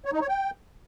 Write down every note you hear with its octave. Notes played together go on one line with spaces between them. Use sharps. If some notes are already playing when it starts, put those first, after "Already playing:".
C#5
D#4
C#5
G5